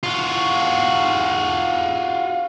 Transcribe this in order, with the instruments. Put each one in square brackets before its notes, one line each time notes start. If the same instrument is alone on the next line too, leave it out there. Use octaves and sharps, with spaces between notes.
[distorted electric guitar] F4 F#4